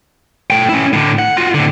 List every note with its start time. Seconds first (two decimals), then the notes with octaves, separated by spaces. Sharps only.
0.50 A3 G5
0.69 C#4 E4
0.93 A2 D3
1.19 F#5
1.37 F4 F#4
1.54 A2 D3